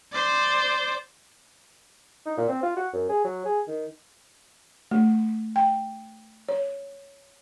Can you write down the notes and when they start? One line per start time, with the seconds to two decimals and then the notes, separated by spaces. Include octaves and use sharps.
0.13 C5 D5
2.26 D#4
2.38 A#2
2.49 C4
2.63 F4
2.77 F#4
2.93 F#2
3.09 G#4
3.24 F#3
3.45 G#4
3.68 D#3
4.91 A3
5.56 G5
6.49 C#5